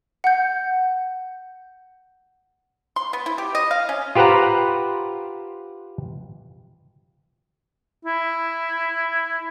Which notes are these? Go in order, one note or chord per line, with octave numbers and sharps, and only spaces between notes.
F#5 G6
C6
B3
E4
G4
D#5
F5
C#4
F4 G4 B4 C5 F#5 A#5
E4